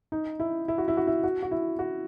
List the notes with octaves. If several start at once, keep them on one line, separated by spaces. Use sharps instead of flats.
D#4
E4
E4
F#4
E4
F#4
E4
F#4
F#4
E4
F#4